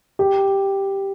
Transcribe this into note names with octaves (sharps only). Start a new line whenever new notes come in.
G4